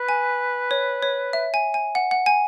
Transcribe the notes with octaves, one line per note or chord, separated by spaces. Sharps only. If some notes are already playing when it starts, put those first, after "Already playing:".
Already playing: B4
G#5
C#5
C#5
E5
G#5
G#5
F#5
F#5
G#5